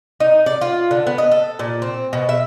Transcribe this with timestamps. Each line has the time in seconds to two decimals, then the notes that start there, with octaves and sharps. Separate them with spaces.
0.20 D#4
0.46 D5
0.61 F4
0.91 D3
1.07 B3
1.18 D#5
1.32 A4
1.59 A#2
1.82 C4
2.13 B2
2.29 E5